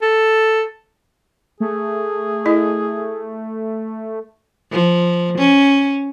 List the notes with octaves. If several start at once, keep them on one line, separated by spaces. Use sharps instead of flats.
A4
A3 G#4
E4 D#5
F3
C#4